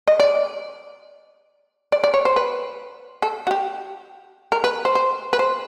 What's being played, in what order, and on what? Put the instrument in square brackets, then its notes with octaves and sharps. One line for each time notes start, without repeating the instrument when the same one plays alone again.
[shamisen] D#5
D5
D5
D5
C#5
C5
B4
A4
F#4
G4
A#4
B4
C5
C5
B4
C5